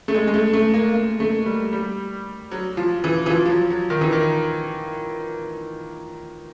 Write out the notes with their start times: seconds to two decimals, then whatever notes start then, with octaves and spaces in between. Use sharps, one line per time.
0.08 A3
0.14 G#3
0.27 G#3
0.34 A3
0.53 A3
0.74 A#3
0.94 A#3
1.20 A3
1.46 G3
1.73 G3
2.51 F#3
2.77 F3
3.04 E3
3.26 E3
3.30 F3
3.46 F3
3.50 F#3
3.70 F#3
3.90 D#3
4.01 E3
4.13 D#3